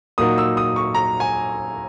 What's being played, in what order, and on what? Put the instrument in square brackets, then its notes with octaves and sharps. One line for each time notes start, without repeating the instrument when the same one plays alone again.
[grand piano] A#2 F#3 A#3 D#4 D#6
E6
D#6
C#6
A#5
G#5